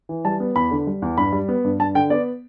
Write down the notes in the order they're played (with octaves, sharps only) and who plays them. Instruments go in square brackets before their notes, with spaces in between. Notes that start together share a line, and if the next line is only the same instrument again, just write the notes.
[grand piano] E3
G3 A5
B3
E2 B5
D3
G3
E2
G2 B5
G3
B3
G2
G2 A5
D3 G5
B3 D5